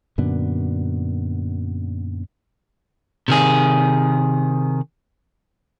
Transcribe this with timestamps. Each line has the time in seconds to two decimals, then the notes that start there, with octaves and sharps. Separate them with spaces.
0.18 F#2 A#2 D3 B3
3.28 C3 D#3 G#4